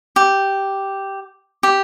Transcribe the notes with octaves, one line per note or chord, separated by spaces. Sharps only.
G4
G4